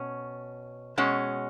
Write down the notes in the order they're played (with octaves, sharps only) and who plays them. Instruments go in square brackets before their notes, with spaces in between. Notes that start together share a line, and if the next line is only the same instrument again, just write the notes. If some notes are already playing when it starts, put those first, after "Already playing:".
Already playing: [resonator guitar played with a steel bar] B2 C#4
B2 G#3 C#4